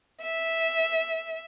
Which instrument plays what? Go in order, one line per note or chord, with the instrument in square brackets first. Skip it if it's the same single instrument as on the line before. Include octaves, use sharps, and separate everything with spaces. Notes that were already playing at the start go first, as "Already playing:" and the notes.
[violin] E5